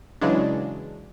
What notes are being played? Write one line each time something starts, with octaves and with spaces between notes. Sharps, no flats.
C#3 E3 F#3 G#3 D4